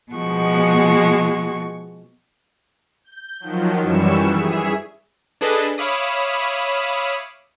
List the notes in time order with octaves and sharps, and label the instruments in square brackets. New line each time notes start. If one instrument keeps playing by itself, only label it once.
[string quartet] B2 F3 G#3 F#4 C#6
[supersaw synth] G6
D#3 F3 F#3
F#2 E3 G3 C#6 E6 E7
G#4 E5
[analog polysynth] D4 G#4 A4 B4 D5 D#5
C#5 E5 F5 B5 D6 D#6